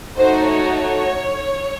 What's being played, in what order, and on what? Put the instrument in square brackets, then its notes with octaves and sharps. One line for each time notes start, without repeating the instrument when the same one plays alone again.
[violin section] A3 D#4 F#4 C5
C#5